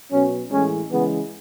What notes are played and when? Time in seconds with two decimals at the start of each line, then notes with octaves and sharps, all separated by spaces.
0.12 B2 F#3 C#4
0.50 A2 E3 G#3 C#4
0.89 C#3 E3 G#3 B3